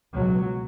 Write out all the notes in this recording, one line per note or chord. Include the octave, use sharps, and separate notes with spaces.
C#2 B2 F#3